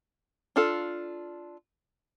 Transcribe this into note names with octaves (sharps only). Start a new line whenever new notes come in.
D4 F4 A4